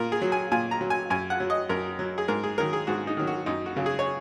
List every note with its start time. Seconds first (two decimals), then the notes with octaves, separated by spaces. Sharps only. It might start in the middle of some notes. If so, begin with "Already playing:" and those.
Already playing: A#2 A#4
0.12 G#4
0.22 F#3
0.32 G#5
0.51 A#2 G#5
0.71 A#5
0.81 F#3
0.90 G#5
1.10 F#2 G#5
1.30 F#5
1.40 F#3
1.50 D#5
1.69 F#2 A#4
1.99 F#3
2.18 G#4
2.28 G#2 A#4
2.43 G#4
2.58 D#3 F#3 A#4
2.73 G#4
2.87 G#2 F#4
3.07 D#4
3.17 D#3 F#3
3.27 F#4
3.46 F#2 D#4
3.66 F#4
3.76 C#3 F#3
3.86 G#4
3.99 C#5